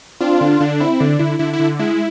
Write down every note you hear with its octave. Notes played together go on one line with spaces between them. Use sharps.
C4 D4 F4
D3
D3 D4
C4 E4
D3 D4
D3 E4
D3 E4
E4
D3
G#3 E4